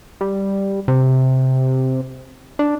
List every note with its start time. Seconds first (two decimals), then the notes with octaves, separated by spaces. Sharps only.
0.21 G3
0.88 C3
2.59 D4